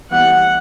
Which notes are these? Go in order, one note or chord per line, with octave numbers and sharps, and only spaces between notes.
E3 G3 B3 F#5